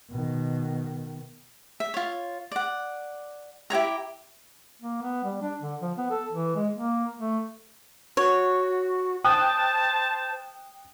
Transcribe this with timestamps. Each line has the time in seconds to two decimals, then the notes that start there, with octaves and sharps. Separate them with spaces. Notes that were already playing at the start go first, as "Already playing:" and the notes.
0.11 B2 D#3
1.80 E5
1.94 F4 C#5
2.52 D5 F#5
3.70 E4 G4 C#5 A#5
4.82 A#3
5.02 B3
5.24 G3
5.42 D4
5.61 D3
5.82 F3
5.98 B3
6.11 A4
6.33 E3
6.56 G#3
6.74 A#3
7.19 A3
8.17 F#4 C#5
9.24 C5 G5 A5 D#6 F#6